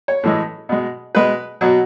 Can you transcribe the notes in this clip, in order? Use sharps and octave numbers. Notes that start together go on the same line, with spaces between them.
C#5
A2 E3 G#3
B2 G#3
B2 G#3 B4
B2 F#3